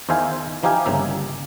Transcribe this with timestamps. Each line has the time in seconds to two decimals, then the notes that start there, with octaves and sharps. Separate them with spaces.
0.09 E2 D#3 C5 E5 F5 G#5
0.63 E3 F3 D#4 G4 F5 G#5
0.85 G1 C#3 A#3 E5